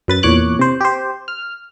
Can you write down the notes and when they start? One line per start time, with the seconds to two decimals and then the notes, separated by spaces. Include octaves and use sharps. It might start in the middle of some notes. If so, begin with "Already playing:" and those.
0.08 F#2 B4 A6
0.23 E2 A#2 C#5 D6 F#6
0.59 C3 C5
0.81 G4 C5
1.28 F6